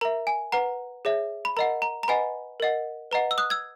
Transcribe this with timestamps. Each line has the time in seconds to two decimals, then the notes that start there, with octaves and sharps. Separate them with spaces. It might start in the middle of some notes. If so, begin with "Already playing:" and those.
0.01 A#4 E5 A#5
0.27 G#5
0.52 B4 F#5 A#5
1.05 G#4 C#5 E5
1.45 B5
1.57 A#4 D#5 F#5 A#5
1.82 A#5
2.03 A#5
2.08 B4 D#5 F#5 G#5 B5
2.60 A#4 D#5 F#5
3.11 B4 D#5 F#5 A#5
3.31 E6
3.38 D#6 F#6
3.50 E6 G#6